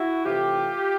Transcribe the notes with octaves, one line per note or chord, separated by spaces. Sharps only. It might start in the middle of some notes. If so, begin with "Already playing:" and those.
Already playing: E4 F#4
C3 E3 A3 F4 G4